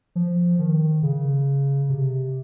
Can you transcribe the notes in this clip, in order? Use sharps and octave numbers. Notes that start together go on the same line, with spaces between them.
F3
D#3
C#3
C3